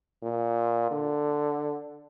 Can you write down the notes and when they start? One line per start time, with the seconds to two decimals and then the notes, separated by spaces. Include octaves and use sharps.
0.23 A#2
0.91 D3